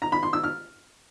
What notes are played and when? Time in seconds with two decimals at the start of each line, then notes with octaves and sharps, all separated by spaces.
0.02 A#5
0.12 B5
0.23 C6
0.33 E6
0.44 F6